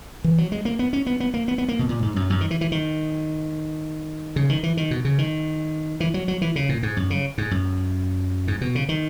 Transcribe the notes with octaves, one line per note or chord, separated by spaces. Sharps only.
E3
F#3
G#3
A#3
B3
C#4
B3
B3
A#3
B3
B3
A#3
B2
A#2
G#2
F#2
F#2
D#3
E3
E3
D#3
C#3
D#3
E3
D#3
B2
C#3
D#3
E3
F#3
F#3
E3
C#3
A#2
G#2
F#2
C#3
G#2
F#2
G#2
B2
C#3
D#3